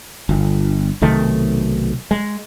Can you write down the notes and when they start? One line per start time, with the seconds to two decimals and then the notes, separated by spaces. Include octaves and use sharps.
0.29 G1
1.02 B1 C3 D#3 A3
2.11 G#3